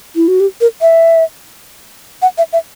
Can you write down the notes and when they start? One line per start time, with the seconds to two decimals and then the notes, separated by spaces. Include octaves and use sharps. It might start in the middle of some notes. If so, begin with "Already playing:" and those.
0.16 E4
0.28 F#4
0.40 G4
0.61 A#4
0.81 E5
2.22 F#5
2.38 E5
2.53 E5